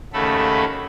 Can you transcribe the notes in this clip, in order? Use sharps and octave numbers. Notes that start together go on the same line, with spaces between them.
D#2 C#3 A3 F#4 A4 B5